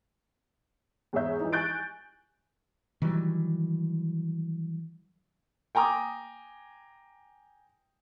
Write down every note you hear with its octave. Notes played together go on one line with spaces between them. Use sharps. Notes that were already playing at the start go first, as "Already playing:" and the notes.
E2 G#2 G#4 C#5 E5 G6
E3 F3 D#4
G#5 C#6 F#6 G6 A6 D7
D#3 E3 F#3 G3
G5 G#5 A#5 D6 D#6